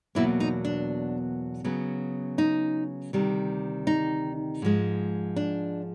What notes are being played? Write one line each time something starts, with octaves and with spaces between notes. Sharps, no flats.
E2 B2 F#3 A#3 E4
D#4
D4
C#3 F#3 B3
D#4
D2 C3 D#3 G3
D#4
G#2 F3 G#3
D4